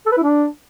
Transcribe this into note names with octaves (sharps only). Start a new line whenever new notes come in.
A4
B4
E4
D4